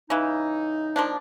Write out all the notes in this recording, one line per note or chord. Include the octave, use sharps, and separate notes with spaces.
C#3 E3 D#4
F3 A#3 D4